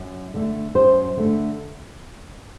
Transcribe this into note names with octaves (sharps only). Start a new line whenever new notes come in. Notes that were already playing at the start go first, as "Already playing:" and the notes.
Already playing: F#2
D3 A3
F#2 C5
D3 A3